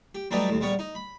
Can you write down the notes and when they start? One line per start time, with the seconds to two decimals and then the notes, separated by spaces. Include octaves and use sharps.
0.15 G4
0.31 F#3 G3 A3 D#4 G4 B4
0.49 D#2 A2
0.61 A#1 G3 B3 C#5
0.79 D#4
0.95 B5